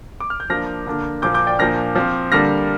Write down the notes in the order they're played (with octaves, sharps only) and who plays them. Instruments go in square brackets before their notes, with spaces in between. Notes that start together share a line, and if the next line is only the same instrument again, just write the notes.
[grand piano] D6
F6
G6
F3 A#3 D4 F6 A#6
D3 A#3 D4
A#2 F3 A#3 D6 G6
D6 G6
D5 G5
A#2 F3 A#3 D4 F6 A#6
F3 C4
D3 G3 A#3 D4 F6 A#6